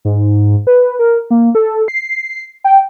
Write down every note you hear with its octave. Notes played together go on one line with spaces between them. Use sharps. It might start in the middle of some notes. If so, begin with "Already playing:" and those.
G#2
B4
A#4
A#3
A4
C7
G5